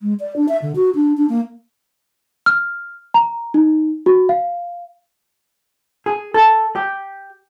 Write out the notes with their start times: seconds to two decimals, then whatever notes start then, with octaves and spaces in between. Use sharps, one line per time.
0.01 G#3
0.20 D5
0.36 D4
0.48 E5
0.62 D3
0.76 F#4
0.95 D4
1.17 D4
1.29 A#3
2.46 F6
3.14 A#5
3.54 D#4
4.06 F#4
4.29 F5
6.06 G#4
6.34 A4
6.76 G4